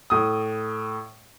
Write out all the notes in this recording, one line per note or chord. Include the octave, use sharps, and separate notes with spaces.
A2 D#6